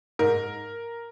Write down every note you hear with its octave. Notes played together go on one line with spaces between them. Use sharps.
G#2 A#4